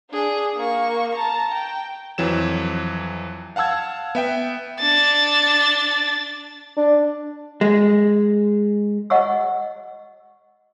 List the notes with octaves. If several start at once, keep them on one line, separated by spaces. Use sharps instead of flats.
D4 G#4
A#3 C#6
A5 A#5
G5
F2 E3 F#3 E7
F5 F#5 A5 E6 G#6
B3 E5 G5
D4 A6
D4
G#3
D#5 F#5 C#6 E6